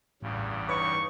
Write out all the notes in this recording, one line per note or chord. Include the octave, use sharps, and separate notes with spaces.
A1 E2 G2 C#3
D#4 B4 C#5 C#6